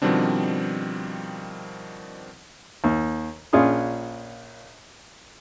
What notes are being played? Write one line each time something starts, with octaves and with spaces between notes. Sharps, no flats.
B2 D#3 F3 G3 C4 D4
D#2
A#1 C#4 D4 F4 G#4 D#6